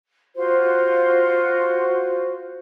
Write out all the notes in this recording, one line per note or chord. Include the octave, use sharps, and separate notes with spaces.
F4 F#4 C5